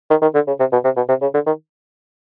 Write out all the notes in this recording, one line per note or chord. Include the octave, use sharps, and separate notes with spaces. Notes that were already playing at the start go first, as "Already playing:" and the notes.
D#3
D#3
D3
C#3
C3
B2
C3
B2
C3
C#3
D3
D#3